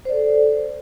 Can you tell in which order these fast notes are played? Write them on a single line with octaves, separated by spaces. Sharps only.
C5 D5 A4